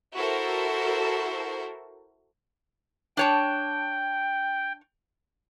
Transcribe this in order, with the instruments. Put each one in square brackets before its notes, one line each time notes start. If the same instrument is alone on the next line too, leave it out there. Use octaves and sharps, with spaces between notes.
[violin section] E4 F#4 A4 A#4 C5
[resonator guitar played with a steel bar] D4 C#5 A5 [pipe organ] G5